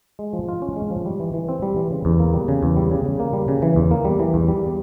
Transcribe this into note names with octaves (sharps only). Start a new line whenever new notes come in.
G#3
F3
F4
C#4
G#3
F3
G3
E3
E3
C4
G3
E3
C#3
E2
A#3
G3
C#3
E2
G3
C#3
C#3
A#3
G3
C#3
E3
E2
A#3
G3
E3
E2
G3